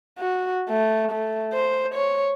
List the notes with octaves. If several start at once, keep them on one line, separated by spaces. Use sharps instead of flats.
F#4
A3
A3
C5
C#5